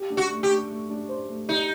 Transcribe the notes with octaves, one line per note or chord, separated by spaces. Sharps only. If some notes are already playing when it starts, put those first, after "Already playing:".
Already playing: G4
D4
F#4
A3
G4
D4
A3
D4
C5
A3
D#4 G4